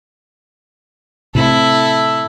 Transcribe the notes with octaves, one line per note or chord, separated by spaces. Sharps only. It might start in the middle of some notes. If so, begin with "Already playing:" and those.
A2 C3 E4 A4